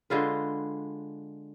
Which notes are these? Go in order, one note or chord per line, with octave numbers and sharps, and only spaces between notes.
D3 G#3 F4 B4